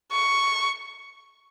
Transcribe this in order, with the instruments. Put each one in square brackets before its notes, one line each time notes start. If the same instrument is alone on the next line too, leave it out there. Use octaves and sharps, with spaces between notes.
[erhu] C#6